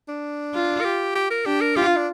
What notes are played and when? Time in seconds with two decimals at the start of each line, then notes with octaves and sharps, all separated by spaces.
0.08 D4
0.54 F4
0.81 A#4
0.84 G4
1.15 G4
1.30 A#4
1.45 D4 G4
1.61 A#4
1.76 F4 G4
1.87 F4
1.97 D4